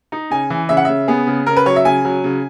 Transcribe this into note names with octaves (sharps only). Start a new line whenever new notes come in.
D#4
C#3 G#5
E3
C#3 E5
F#5
C#3 E5
B3 G#4
C#3
C#3 A#4
B4
F#3 C#5
E5
C#3 G#5
F#3
C#3